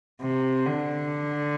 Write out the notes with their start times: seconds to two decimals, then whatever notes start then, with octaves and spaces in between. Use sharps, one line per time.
0.22 C3
0.66 D3